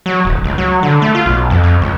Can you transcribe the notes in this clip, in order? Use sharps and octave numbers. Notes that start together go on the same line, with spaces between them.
F#3
D1
C#2
F#3
D3
A3
F4
B1
F2
F2
C#2